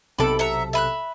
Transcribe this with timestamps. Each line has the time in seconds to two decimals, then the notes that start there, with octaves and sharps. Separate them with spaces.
0.19 B1 C3 A4 B5 D6
0.39 E5 F#5 A#5
0.73 E5 B5 F#6